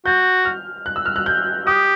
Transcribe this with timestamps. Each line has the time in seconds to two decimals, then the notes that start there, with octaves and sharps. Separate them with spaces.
0.06 F#4 G6
0.45 F6
0.86 F#6
0.96 E6
1.06 F6
1.16 F#6
1.26 G6
1.67 G4 D#6